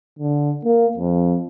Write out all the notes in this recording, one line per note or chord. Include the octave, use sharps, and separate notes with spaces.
D3
A#3
F2